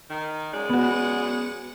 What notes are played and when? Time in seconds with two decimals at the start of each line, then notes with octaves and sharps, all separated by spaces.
0.10 D#3
0.53 F#2 G#3 D5
0.70 B3 F#4